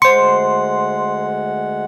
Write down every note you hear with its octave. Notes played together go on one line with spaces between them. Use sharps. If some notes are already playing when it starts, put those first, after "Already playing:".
D2 G#3 C5 F#5 C6 C#7